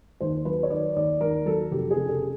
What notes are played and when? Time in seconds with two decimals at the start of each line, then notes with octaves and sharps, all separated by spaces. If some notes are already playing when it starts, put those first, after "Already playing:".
0.21 D#2 C5
0.45 F#3 B4
0.63 C#5
0.70 D#3 D5
0.96 D#2 D5
1.21 D#2 A#4
1.46 F#3 A4
1.72 F1 G4
1.91 G#4
1.96 C#3
2.09 A4